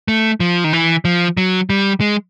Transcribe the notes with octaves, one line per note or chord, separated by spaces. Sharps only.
A3
F3
D#3
E3
F3
F#3
G3
G#3